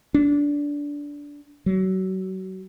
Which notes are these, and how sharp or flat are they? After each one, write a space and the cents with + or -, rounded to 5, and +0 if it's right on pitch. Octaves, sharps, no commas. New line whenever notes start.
D4 -15
F#3 +30